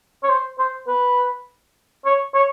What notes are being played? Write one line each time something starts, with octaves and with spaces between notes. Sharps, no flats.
C#5
C5
C5
B4
C#5
C#5